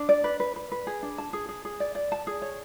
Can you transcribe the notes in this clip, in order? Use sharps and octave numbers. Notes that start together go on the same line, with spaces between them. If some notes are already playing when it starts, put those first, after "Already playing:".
Already playing: D4
D5
B4
B4
B4
B4
G#4
D4
A5
G#4
G#4
G#4
D5
D5
A5
G#4
C#5